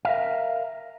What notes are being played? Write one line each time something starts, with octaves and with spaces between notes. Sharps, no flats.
A#4 E5 F5